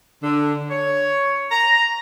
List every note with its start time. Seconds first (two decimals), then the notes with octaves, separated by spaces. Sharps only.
0.23 D3
0.70 C#5
1.51 A#5